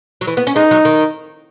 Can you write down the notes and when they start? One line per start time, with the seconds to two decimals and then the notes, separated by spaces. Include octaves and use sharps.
0.21 F#3
0.27 E3
0.37 B3
0.47 C#4
0.56 G#3 D#4
0.71 F#3
0.85 D#3